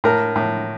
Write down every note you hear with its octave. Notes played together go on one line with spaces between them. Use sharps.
A2 A#4
A2